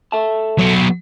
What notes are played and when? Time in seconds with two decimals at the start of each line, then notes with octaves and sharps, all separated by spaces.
0.12 A4 E5 A5
0.58 F#3 B3